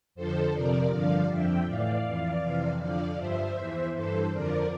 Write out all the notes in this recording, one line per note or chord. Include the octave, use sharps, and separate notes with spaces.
F2 D3 F3 A4 C5
F2 C3 F3 A#4 D5
G2 D3 F3 D5 F5
F2 D3 F3 E5 G5
A2 E3 D5 F5
F2 E3
F2 C3 E3
F2 D3 F3 D5 F5
G2 F3 C5 E5
E2 E3
G2 E3 A4 C5
F2 D3 F3 A#4 D5